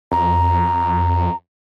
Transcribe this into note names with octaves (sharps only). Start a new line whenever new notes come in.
F2 A#5